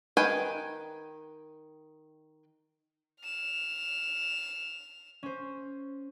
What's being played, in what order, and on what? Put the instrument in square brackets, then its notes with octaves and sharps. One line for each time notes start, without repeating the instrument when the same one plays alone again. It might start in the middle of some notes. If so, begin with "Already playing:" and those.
[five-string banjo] D#3 B4 G5 G#5
[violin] F6 E7
[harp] C#4 C5